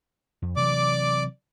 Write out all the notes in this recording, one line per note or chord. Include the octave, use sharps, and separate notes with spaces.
F2
C3 E3 F#3 D5 D6